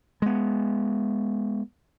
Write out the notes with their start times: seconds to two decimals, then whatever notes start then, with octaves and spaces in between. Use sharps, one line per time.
0.22 G#3 B3